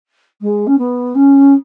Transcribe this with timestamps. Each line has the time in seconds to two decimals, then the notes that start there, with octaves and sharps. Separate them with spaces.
0.41 G#3
0.67 C#4
0.78 B3
1.15 C#4